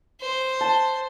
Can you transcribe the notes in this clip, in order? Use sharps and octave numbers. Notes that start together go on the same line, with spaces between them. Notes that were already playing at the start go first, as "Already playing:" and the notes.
C5
A5